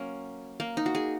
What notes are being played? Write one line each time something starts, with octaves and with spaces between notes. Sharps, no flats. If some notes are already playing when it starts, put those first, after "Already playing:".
Already playing: F#3 A#3 C#4
A#3
D#4
F#4
G#4